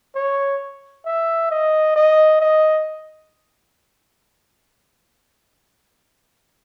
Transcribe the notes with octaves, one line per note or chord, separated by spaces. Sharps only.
C#5
E5
D#5
D#5
D#5